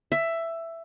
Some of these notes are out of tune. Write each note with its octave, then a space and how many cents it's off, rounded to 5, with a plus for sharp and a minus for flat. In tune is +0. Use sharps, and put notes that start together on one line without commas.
E5 +10